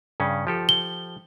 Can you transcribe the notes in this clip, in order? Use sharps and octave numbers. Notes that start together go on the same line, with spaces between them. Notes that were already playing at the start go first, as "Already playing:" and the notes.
G2 C#3 C#4
F3 G4 A4
G7